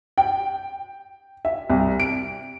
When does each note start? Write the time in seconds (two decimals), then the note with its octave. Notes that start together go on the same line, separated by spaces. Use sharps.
0.18 G5
1.45 E5
1.70 C2
2.00 D7